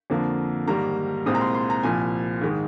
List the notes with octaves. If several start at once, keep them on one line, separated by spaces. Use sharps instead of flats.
F2 D3 F3 A#3
G#2 D#3 G3 A#3 A#5
C2 A#2 G#3 C4 D#6
A#5
C6
C6
A#5
C2 A#2 F3 G#5
G#2 D#3 G#3